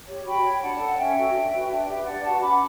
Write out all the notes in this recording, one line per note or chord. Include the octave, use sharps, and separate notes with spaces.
G4 C#5
F#4 G5 B5
C#5
D4 F#5 A5
A4
C#5
C#4 E5 G5
F#4 A4 C#5
D4
F#4 B4
D4
G4 B4
D4 D5 F#5
F#4 B4 F#5 A5
C#4 B5 D6